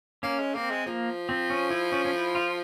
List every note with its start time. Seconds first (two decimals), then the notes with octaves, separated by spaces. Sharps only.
0.23 A#3 C#4
0.39 G#3
0.55 A#3 C4
0.71 G#3
0.86 F3 A#3
1.29 C4
1.50 C#4
1.71 E4
1.92 C#4
2.05 C#4
2.13 E4
2.35 F4